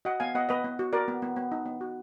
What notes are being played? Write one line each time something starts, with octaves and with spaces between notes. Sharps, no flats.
F#4 D#5 F#5
B3 F5 G#5
B3 D#5 F#5
B3 B4 D#5
B3
F#4
F#4 A#4 D5
B3
B3
B3
D#4
B3
F#4